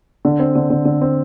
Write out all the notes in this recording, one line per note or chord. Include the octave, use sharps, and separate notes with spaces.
D3
C4
D3
D3
D3
C4